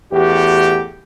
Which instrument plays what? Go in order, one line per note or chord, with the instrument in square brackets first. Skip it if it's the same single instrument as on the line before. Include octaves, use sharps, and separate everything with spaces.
[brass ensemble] E2 A2 F#4 G4